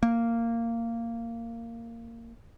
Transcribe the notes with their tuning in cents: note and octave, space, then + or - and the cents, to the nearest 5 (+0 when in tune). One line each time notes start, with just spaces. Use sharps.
A#3 -15